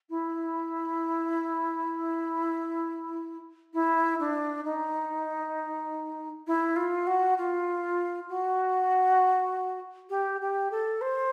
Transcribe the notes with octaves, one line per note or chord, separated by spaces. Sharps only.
E4
E4
D4
D#4
E4
F4
F#4
F4
F#4
G4
G4
A4
C5